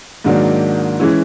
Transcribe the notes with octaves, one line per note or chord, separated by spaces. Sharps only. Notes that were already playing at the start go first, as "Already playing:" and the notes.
G#2 D#3 F#3 A#3 D4
E3 G#3 C#4 E4